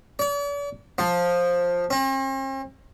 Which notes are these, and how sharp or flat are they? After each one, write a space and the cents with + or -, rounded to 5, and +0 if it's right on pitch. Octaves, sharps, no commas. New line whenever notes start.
D5 -45
F3 +10
C4 +45